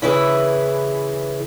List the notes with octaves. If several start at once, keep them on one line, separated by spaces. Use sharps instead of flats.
C#3 E3 E4 G#4 B4